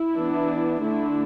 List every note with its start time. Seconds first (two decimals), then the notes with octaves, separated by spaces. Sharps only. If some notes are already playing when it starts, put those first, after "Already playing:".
Already playing: E4
0.15 E3 B3 D4
0.81 D3 A3 D4 E4